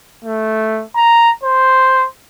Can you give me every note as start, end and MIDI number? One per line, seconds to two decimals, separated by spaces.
0.24 0.83 57
0.95 1.30 82
1.43 2.06 72